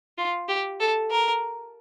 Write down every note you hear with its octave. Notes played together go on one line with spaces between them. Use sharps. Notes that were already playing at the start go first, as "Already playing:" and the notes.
F4
G4
A4
A#4